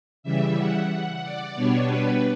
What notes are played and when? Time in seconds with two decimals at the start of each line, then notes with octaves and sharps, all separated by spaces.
0.23 C#3 E3 G3 E5
0.57 F#5
0.89 F#5
1.22 D5
1.55 B2 G3 B3 D4 C#5
1.89 B4